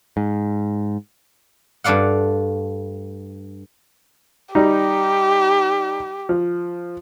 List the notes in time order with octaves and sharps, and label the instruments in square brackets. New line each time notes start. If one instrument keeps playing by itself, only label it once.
[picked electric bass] G#2
[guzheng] G2 A3 D5 F5 F#5
[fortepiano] G3 D#4 [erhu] G4
[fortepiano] F3